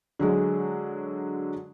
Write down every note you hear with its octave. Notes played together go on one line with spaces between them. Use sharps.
D3 F#3 G#3